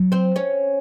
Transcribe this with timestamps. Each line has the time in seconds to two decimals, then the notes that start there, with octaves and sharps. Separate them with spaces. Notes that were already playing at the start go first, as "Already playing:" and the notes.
Already playing: F#3
0.12 C4 C5
0.36 C#4 C#5